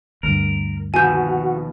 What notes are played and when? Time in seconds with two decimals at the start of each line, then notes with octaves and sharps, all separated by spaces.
0.23 D2 G2 A#4
0.94 D#2 B2 F3 F#4 F#5 G#5 G6